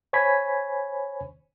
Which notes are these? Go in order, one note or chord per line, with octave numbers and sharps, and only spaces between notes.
C5 C#5 G#5 B5 G#6 B6